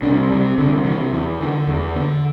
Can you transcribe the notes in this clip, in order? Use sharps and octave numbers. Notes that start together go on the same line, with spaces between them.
C2 D4
C3 G3
C2 D3
C3 E3
E2 E3
D3
E2
D3